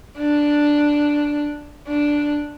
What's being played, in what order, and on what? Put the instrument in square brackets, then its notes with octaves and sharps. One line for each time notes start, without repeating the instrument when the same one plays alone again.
[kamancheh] D4
D4